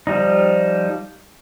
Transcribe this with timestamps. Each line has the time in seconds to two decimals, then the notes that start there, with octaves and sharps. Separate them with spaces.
0.07 F3 G3 D#4